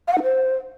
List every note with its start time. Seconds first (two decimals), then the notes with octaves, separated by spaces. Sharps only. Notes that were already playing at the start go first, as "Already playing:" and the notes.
0.08 F5
0.13 F#5
0.18 D#4
0.23 C5